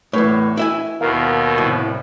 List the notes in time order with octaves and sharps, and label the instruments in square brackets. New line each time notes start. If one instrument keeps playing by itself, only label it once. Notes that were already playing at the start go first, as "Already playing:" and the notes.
[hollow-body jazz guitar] E2 A2 [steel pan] B4 C#5
[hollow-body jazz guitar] E4 E5 G#5
[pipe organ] D#2 B2 [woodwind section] A#4 [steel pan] F5
[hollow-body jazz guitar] C2 [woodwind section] F#2 A2